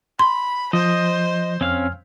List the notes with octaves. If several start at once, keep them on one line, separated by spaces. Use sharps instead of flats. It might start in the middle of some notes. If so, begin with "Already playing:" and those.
B5 C6
F3 C5 D#5
F2 C4 C#4 F5 F6